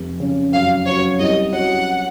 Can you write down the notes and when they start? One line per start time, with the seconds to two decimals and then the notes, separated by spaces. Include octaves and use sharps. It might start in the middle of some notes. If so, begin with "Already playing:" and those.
Already playing: F1
0.20 C#3
0.52 F#2 F5
0.86 F#3 C#5
1.19 C2 D#5
1.53 F#3 F#5